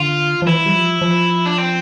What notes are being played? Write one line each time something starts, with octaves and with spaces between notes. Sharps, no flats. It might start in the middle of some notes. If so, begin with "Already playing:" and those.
Already playing: D3 F4
F3
E3 E4
G3
F3
F3
D4
C4